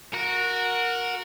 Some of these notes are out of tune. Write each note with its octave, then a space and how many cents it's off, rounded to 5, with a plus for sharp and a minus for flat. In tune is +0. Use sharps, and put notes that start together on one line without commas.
F#4 -15 A#4 +0